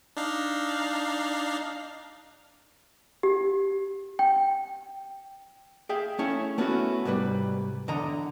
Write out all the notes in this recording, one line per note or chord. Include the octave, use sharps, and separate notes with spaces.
D4 D#4 F5
G4
G5
G#4 E5 F5 G5
A3 C#4 E4 C#5 E5
A3 B3 C#4 D4 E4 F#4
C2 G#2 G3 B4
E2 D3 D#5 A#5